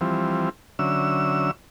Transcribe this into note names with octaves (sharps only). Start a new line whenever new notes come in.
E3 F3 G3 C4
D3 F#3 C#4 E5 E6